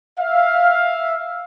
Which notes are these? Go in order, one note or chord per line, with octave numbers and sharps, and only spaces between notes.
E5 F5